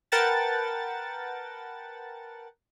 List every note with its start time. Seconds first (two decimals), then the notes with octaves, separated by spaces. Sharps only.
0.12 A#4 B4 F#5 G5 A5 A6